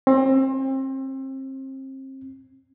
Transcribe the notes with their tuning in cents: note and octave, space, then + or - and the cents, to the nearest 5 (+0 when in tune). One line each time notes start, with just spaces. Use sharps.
C4 +35